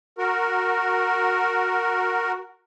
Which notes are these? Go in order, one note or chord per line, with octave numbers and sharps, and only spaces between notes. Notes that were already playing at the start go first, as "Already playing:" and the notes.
F#4 A#4